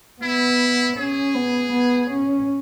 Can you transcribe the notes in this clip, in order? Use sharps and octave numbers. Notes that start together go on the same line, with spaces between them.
B3 E4
C#4 G#4
B3
B3
C#4